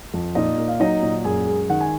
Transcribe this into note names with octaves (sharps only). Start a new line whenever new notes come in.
F2
A#2 D#4 D#5
A#3
F5
F#3 D#4 D#5
A#2
F#2 G#4 G#5
G#3
D#3 F#5
G#5